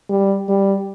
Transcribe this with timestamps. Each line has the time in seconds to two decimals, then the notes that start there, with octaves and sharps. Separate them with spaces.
0.09 G3
0.49 G3